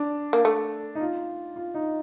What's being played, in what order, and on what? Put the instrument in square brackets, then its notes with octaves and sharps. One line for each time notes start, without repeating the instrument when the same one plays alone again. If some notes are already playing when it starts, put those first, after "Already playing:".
Already playing: [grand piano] D4
[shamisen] A#3
A3
[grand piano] D#4
F4
F4
D#4